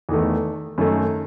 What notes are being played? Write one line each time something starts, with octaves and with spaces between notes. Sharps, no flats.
E2 D#3 A3
F#2 D#3 A3